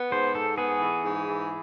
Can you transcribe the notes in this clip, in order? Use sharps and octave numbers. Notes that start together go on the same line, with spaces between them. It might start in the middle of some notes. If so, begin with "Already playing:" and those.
Already playing: B3
G#2 C5
G#2 A4
B3 G#4
E3
G#2
E3